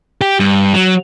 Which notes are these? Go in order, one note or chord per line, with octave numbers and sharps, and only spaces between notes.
G4
G2
F#3